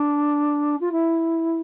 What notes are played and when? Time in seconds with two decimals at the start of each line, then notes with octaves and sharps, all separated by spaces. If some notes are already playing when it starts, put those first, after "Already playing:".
Already playing: D4
0.80 F4
0.91 E4